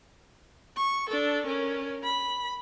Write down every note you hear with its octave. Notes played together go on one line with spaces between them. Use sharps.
C#6
D4 A4
C#4 A#4
B5